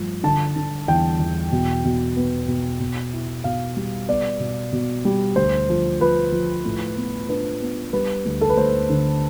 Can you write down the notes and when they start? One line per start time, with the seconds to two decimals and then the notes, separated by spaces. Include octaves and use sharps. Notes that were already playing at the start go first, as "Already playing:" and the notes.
Already playing: G2 F3 A3
0.23 D3 A5
0.56 D3
0.88 E2 G5
1.20 E2
1.52 B2
1.85 B2
2.16 B3
2.48 B2
2.80 B2
3.13 E4
3.44 B2 F5
3.77 G3
4.08 B3 D5
4.40 B2
4.73 B2
5.05 G3
5.36 D2 C5
5.69 F3
6.00 F3 B4
6.32 F3
6.65 A2
6.97 B3
7.29 D4 B4
7.61 B3
7.93 G3 B4
8.25 D2
8.41 A4
8.50 B4
8.57 D2 C5
8.89 D3